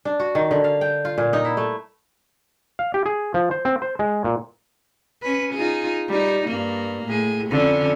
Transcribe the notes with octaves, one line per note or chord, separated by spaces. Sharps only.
D4
F#4
D#3
D3
F5
G5
F4
A#2
D#4
E4
A3
F5
G4
G#4
F3
C5
C4
C5
G#3
A#2
C#4 B4
D#4 F4 G#4
G3 D#4
G2 A#3
A2 G#4
F2 D3 C#4